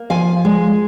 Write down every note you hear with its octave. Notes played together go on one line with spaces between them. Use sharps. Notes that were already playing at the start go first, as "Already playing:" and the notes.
Already playing: A#3
F3 F5 G#5
G#3